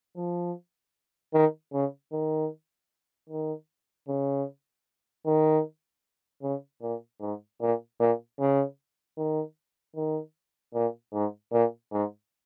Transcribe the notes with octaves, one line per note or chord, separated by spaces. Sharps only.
F3
D#3
C#3
D#3
D#3
C#3
D#3
C#3
A#2
G#2
A#2
A#2
C#3
D#3
D#3
A#2
G#2
A#2
G#2